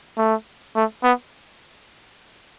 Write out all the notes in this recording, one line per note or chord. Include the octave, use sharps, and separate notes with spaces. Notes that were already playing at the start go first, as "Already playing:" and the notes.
A3
A3
B3